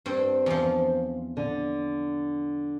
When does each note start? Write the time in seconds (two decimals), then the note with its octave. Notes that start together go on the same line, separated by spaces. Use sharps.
0.06 G2 C4
0.46 E2 F3
1.37 D3